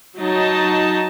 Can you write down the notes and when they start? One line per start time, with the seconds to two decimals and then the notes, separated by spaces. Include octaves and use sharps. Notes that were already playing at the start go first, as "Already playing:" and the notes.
0.17 F#3 D#4 A5